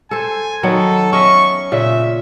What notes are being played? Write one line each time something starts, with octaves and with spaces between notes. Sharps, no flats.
A4 C5 G#5
D#3 F#3 B3 A4
C#4 D#5 E5 C#6
A#2 C#3 E5